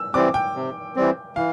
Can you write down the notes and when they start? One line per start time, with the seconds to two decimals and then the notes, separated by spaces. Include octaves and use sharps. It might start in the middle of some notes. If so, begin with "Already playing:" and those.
Already playing: E6
0.14 E3 G3 C4 D6
0.34 G5
0.55 C3
0.96 E3 G3 C4
1.36 E3 F5